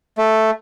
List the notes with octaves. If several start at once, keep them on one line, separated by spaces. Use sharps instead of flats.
A3